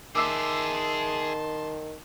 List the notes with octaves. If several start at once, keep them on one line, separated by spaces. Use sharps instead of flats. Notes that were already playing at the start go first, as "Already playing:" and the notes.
D#3 G#4 E5 A5 C6 D6 E6 C7